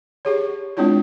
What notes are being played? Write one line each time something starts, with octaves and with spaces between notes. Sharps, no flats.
G4 G#4 C#5
G#3 C4 D4 E4 F4 C#5